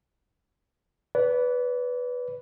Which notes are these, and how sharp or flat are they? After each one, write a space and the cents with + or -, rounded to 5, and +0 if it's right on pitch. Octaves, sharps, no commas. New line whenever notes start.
B4 +0 D5 -35